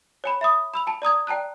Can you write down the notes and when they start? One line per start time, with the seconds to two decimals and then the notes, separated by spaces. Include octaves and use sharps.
0.24 C#5 G#5 B5
0.41 E5 B5 D#6
0.74 B5 E6 F7
0.87 G#5 A5
1.02 D5 A#5 D#6 G#6
1.27 D5 G5 A5 A#5 F#6